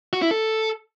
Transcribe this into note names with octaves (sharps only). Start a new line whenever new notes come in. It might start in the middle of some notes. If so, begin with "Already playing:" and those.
F#4
E4
A4